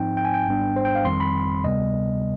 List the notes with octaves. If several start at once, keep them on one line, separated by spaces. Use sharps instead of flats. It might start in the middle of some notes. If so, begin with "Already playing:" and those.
Already playing: G#2 F3 C4 D#4 G5
G5
G#5
G5
G#1 G#2 G3 B3 D4
C5
G5
F5
G1 F2 D#3 G3 C4 C6
B5
D2 C3 G3 B3 D#5